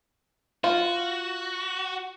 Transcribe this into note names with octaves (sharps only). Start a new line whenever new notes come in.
F4 F#4